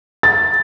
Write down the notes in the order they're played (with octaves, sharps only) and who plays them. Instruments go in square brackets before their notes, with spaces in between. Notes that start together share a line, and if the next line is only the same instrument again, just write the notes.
[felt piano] A6